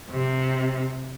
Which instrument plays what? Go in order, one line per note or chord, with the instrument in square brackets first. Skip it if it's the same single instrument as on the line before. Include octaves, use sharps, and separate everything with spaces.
[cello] C3